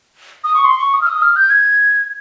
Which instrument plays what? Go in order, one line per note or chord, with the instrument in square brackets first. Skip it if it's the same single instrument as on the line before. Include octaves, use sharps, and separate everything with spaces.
[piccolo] D#6
C#6
C6
C#6
D#6
F6
D#6
F6
G6
G#6